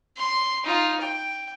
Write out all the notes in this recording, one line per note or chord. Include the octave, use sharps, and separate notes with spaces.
C6
D#4 F4
G5